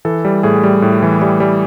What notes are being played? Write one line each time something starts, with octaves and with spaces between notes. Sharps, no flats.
E3 A4
G3
A2 G#4
G3
A2
E3
G3
G3